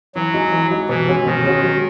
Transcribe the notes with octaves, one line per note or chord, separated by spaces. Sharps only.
E3 F#3
G#3 D#4 F#4
E3
G#3 D#4 F#4
B2 E3
G#3 C#4 F#4
B2 D#3
G#3 C#4 F#4
F#3